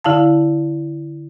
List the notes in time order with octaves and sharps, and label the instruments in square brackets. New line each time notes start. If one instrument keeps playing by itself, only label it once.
[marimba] D3 E4 F5 A5